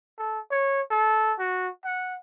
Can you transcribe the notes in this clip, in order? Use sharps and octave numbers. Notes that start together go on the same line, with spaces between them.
A4
C#5
A4
F#4
F#5